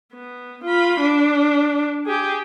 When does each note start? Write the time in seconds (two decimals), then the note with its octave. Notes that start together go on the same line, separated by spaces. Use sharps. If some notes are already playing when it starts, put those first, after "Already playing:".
0.14 B3
0.64 F4 B5
1.01 D4
2.06 G4 G#4